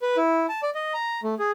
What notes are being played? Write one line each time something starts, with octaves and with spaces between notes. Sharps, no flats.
B4
E4
A5
D5
D#5
A#5
A3
G#4